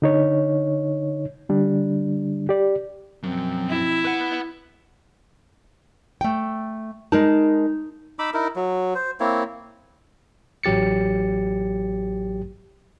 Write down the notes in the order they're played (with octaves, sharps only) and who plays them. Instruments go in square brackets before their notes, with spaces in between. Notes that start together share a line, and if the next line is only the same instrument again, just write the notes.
[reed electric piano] D3 D#4 C#5
D3 G3 D4
G4 D5
[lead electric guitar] F#2 [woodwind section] B2 F3 C4
[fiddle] E4
[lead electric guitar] B4 F#5
[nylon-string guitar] A3 G5
[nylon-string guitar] G#3 A#4 A5 [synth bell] D#4
[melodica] D#4 B5 D6 E6
D#4 E4 A#4
F#3
C5
A#3 C4 E4 C#5
[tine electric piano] A1 F#3 G4 A6 C#7